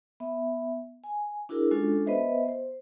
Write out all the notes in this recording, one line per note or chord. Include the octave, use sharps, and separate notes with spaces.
B3 E5
G#5
D4 E4 F#4 G#4 A#4
G#3 C#4 D4 F4 F#4 A4
B3 B4 C5 D#5 E5
C5